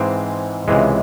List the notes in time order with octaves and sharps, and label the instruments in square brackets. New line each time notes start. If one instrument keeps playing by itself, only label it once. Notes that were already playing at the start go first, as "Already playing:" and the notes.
Already playing: [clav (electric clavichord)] G#2 E3 G#3 C4
C#2 C3 E3 G#3